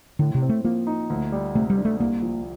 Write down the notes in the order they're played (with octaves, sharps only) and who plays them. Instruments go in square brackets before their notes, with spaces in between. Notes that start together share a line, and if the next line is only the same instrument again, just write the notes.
[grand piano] A2 [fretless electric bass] D3
[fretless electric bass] C3
[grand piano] C4
[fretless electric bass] A3
[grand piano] F3 [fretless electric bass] A#3
[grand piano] D#4
D2
G3
[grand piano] C3 [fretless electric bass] A3
[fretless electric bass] G3
[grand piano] D4
[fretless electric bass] A3
[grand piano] C2 [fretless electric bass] A#3
[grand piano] F3